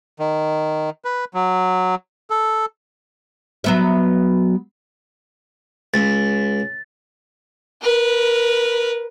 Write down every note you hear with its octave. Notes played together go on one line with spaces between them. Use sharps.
D#3
B4
F#3
A4
F#3 B3 E5
C#2 A6
A#4 B4